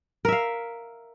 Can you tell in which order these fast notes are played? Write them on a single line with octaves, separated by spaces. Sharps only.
A#4 E5 F5